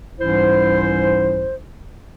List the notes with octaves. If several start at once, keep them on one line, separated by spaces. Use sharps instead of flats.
C2 G#2 E3 C#4 E4 C5